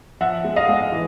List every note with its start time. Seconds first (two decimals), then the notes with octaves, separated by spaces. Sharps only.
0.21 F3 E5 F#5
0.44 G#3
0.56 D#5 F5
0.68 G#3
0.92 E3